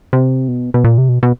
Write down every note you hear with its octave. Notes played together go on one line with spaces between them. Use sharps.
C3
B2
B2
A#2
C3
B2
B2